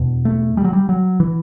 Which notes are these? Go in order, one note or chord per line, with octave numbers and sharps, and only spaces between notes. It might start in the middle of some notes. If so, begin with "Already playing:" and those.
Already playing: E2 B2
A3
G3
F#3
G3
F#3
E3